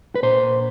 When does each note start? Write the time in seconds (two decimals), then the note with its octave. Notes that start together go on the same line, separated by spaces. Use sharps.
0.15 B4
0.23 A#2 C5